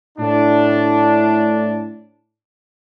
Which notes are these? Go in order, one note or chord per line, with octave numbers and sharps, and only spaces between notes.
A2 D4